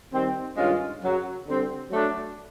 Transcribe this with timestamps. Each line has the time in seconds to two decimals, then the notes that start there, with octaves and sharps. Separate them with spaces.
0.12 D#3 G3 C4
0.57 G2 D#3 G#3 C#4 F4
1.01 F#2 C#3 F#3
1.47 D3 G3 C4
1.91 F#3 A3 D4